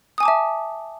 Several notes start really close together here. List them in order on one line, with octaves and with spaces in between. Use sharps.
D#6 G#5 D6 A5 E5